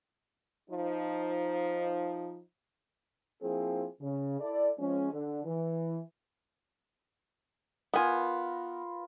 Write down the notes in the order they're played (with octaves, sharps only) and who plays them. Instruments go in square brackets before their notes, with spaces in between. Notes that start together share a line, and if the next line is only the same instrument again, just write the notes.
[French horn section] F3 D#4
[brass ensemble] F3 A#3 C4 E4 G#4
C#3
E4 A4 D5
F3 G#3 C#4
D3
E3
[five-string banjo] B3 G#5 [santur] F4 A#4 B4